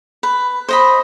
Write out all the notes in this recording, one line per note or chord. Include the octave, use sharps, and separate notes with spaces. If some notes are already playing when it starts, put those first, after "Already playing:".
B4
C5 D#5 B5